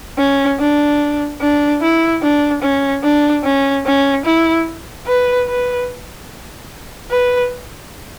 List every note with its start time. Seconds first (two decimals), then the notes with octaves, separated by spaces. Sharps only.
0.18 C#4
0.60 D4
1.41 D4
1.82 E4
2.22 D4
2.62 C#4
3.03 D4
3.44 C#4
3.85 C#4
4.25 E4
5.07 B4
5.48 B4
7.10 B4